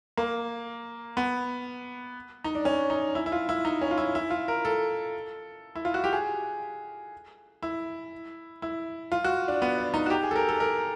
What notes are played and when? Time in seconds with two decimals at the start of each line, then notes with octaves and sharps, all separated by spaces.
0.17 A#3
1.17 B3
2.44 D#4
2.55 D4
2.65 C#4
2.90 D#4
3.15 E4
3.26 E4
3.32 F4
3.49 E4
3.65 D#4
3.81 C#4
3.91 F4
3.98 E4
4.15 E4
4.30 F4
4.48 A#4
4.65 A4
5.75 E4
5.85 F4
5.94 F#4
6.04 G4
6.13 G#4
7.63 E4
8.62 E4
9.12 F4
9.24 F#4
9.48 D4
9.62 B3
9.78 D4
9.94 D#4
10.06 F#4
10.10 G4
10.23 G#4
10.31 A4
10.36 A#4
10.49 A4
10.60 A#4